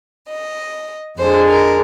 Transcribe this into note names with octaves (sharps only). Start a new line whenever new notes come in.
D#5
F2 D3 G#3 C5
A#4